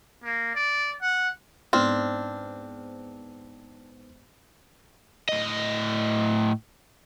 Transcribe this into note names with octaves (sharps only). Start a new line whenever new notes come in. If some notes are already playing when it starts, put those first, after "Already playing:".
A#3
D5
F#5
G#2 B3 C4 D4 F6
A2 D#5